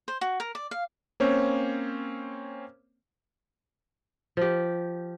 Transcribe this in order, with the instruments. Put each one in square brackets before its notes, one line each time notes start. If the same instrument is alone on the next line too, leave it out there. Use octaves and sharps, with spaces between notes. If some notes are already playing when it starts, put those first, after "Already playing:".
[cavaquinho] C5
F#4
A#4
D5
F5
[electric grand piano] A#3 C4 C#4 C5 C#5
[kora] F3 G4